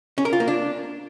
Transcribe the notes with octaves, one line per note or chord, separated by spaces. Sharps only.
C#4
A#4
F4
A#3
D4